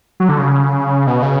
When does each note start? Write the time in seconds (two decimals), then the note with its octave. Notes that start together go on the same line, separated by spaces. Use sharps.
0.20 F#3
0.29 D3
0.39 C#3
1.07 B2
1.22 C#3